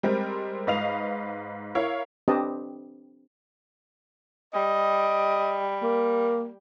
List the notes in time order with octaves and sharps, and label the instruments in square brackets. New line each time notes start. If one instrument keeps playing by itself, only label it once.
[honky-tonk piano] G3 G#3 C4 A#4
G#2 B4 D#5 F5 F7
E4 A#4 C#5 F5
[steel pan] C4 D4 G4 B4 D#5 A5
[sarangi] G3 [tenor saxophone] D#5
[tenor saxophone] A#3